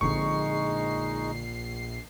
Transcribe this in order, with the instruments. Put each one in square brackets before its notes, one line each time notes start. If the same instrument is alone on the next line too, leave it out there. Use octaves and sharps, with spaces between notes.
[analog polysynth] A#1 C7 [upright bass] D3 C4 [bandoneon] G#3 D#4 [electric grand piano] C#6